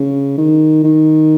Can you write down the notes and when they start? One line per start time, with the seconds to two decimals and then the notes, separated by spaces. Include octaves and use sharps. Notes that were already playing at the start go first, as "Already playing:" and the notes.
Already playing: C#3
0.38 D#3
0.84 D#3